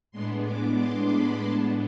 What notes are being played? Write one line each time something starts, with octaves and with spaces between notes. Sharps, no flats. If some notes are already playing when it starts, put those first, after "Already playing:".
A2 G#3 B3 D4 C6
D6
C6
B5
A2 G#3 B3 D4 A5